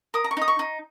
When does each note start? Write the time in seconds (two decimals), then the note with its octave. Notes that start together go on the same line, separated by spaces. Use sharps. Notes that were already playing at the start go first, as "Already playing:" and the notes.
0.14 A#4 D#6
0.24 A#5
0.31 C#6
0.37 D#4 D#6
0.48 C#6
0.59 D#4